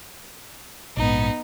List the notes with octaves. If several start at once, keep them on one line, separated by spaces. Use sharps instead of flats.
A#1 G#2 B3 D#4